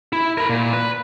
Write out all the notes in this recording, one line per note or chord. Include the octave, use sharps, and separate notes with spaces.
E4
A#4 B5
A#2
B4